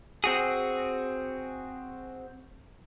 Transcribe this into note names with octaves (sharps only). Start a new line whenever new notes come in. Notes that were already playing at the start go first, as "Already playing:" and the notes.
C4 F#4 G#4